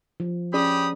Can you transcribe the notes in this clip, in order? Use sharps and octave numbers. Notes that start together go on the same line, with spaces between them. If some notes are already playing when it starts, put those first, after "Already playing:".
F3
C#4 G4 G#4 D5 B5 D#6